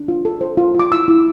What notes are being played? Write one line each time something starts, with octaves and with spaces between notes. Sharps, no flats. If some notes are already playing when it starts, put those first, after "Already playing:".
Already playing: D4
F4
A4
C5
F4
F4 D6
E4 E6
E4